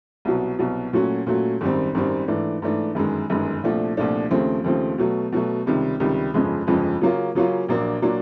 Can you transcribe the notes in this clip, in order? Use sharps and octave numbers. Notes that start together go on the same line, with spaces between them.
C2 B2 F#3
C2 B2 F#3
A#2 F#3 A3 C#4 F#4
A#2 F#3 A3 C#4 F#4
G#1 F#2 D#3 G3 C4
G#1 F#2 D#3 G3 C4
G#2 E3 A3 D4
G#2 E3 A3 D4
G1 F#2 D#3 G#3
G1 F#2 D#3 G#3
C2 A#2 F3 A3 D4
C2 A#2 F3 A3 D4
D#2 C#3 F3 A3 C4
D#2 C#3 F3 A3 C4
B2 F#3 A3
B2 F#3 A3
C#2 C3 D#3 G3
C#2 C3 D#3 G3
G1 F2 C#3 F3 G#3
G1 F2 C#3 F3 G#3
C#3 F#3 A#3 C#4 F4
C#3 F#3 A#3 C#4 F4
A#1 A#2 F#3 A#3 D4
A#2 F#3 A#3 D4